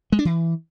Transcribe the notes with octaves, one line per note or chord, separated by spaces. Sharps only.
G#3
D4
E3